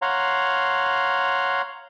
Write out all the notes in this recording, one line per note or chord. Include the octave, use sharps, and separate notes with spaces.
C#5 F5 F#5 A#5 C6